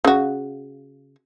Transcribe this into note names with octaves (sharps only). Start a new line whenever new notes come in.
C#3 F#4